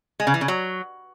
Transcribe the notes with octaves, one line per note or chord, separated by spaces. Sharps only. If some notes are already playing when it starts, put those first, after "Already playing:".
G#3
C#3
E3
C#3
F#3